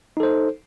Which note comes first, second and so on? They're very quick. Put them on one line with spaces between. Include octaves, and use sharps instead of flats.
D#4 A4 C5